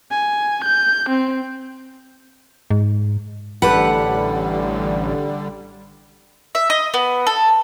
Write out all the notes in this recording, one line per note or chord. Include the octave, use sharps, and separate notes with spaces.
G#5
G6
C4
G#2
A1 D3 G3 G4 A4 B4 F#5
E5
D#5
B3
A4